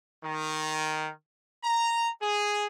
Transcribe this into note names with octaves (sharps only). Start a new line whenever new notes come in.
D#3
A#5
G#4